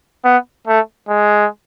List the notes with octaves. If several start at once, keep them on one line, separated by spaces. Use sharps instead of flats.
B3
A3
G#3